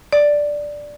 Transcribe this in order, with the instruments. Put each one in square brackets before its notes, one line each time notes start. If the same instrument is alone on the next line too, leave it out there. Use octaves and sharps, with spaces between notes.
[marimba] D5